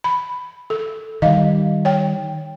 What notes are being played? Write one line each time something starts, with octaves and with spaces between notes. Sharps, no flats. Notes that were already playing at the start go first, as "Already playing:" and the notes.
B5
A4
D#3 G3 D#5 F5
C#5 G5